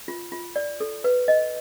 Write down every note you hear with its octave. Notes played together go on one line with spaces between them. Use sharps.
F4
F4
D5
A4
B4
D#5